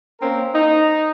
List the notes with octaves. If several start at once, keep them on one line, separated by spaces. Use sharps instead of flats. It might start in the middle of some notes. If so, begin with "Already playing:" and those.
A#3 C4 C#4 A#4
D#4